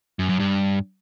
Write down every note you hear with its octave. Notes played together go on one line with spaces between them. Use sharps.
F#2
F#2
G2